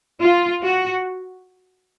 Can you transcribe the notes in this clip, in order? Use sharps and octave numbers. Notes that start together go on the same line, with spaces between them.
F4
F#4